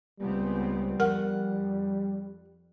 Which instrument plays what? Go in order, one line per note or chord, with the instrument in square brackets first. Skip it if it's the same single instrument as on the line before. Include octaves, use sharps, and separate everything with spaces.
[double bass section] C#2 B3 C4 [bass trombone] G3
[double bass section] F2 [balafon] A#4 [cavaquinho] F#5